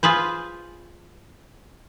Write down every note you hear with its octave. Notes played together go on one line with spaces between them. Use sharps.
F4 G#4 B4 C5